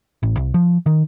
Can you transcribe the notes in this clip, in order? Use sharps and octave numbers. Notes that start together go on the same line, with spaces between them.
A1
C2
F3
D#3